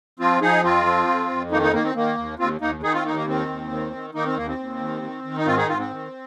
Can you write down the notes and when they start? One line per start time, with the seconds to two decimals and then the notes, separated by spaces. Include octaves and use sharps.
0.19 F3 C4 F4
0.42 F3 D#4 G#4
0.63 F2 C4 F4
0.86 F3
1.08 F2
1.30 F2
1.51 D#3 A#3 D#4
1.62 A#3 D#4
1.73 D#3 A#3
1.84 C4
1.95 D#3 A#3
2.18 D#2
2.39 D#2 C4 F4
2.61 D#2 A#3 D#4
2.83 D#3 D#4 G#4
2.94 C4 F4
3.04 D#2 A#3 D#4
3.16 A#3
3.27 D#3 C4
3.49 D#2
3.71 D#3
3.93 D#3
4.15 D#3 A#3 D#4
4.26 C4
4.37 D#2 A#3
4.48 C4
4.59 D#2
4.80 D#3
5.02 D#3
5.24 D#3
5.37 D#4
5.46 G#2 C4 F4
5.57 D#4 G#4
5.68 G#2 C4 F4
5.79 C4
5.90 D#3